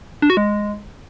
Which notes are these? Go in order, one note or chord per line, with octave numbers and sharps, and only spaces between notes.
D4
F#4
G#3